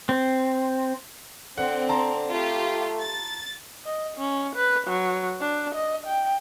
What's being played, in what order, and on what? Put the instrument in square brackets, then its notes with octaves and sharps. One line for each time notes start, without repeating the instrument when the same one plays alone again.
[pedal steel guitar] C4
[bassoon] D3 [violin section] C4 [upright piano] F#5
[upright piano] A5 A#5 C6
[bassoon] A3 [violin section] F4 G4
[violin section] A6
[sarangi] D#5
C#4
B4
F#3
D4
D#5
G5